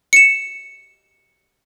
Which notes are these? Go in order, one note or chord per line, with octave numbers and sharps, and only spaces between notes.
C#7 E7